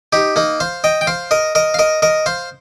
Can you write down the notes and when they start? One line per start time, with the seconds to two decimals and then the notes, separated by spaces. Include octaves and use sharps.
0.13 D#4 G4
0.36 A#3 D#4
0.60 C5 F5
0.84 D#5 G5
1.01 G5
1.07 C5 F5
1.31 A#4 D#5
1.55 A#4 D#5
1.74 F5
1.79 A#4 D#5
2.02 A#4 D#5
2.26 C5 F5